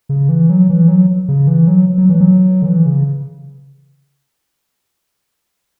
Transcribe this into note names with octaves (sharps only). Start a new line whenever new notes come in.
C#3
E3
F#3
E3
F#3
C#3
E3
F#3
F#3
E3
F#3
D3
E3
C#3